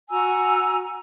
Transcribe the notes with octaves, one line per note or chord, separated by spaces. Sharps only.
F#4 G#5 A#5 E6